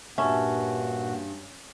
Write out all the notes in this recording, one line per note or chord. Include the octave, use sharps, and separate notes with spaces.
G2 A#2 C#4 F#4 E5 A5